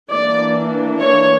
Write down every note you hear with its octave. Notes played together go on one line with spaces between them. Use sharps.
E3 A#3 D4 D5
C#5